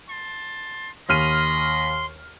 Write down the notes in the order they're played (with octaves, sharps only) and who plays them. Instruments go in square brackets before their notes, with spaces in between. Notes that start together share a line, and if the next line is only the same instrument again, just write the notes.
[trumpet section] A5 C6
[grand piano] D#2 F6 D#7 [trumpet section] D#5 B5 [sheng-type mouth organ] C6